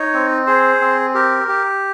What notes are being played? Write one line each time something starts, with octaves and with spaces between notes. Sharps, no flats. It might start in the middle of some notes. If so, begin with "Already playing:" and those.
Already playing: D#4 C#5
C4
G#4 C5
C4
G4 A#4
G4